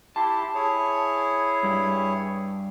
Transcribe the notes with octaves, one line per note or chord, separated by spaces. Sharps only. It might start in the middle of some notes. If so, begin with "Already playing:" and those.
E4 G4 A5 C6
E4 G#4 C#5
G2 G3